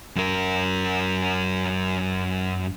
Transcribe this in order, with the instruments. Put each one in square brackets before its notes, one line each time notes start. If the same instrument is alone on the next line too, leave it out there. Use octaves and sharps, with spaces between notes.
[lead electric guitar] F#2 A#4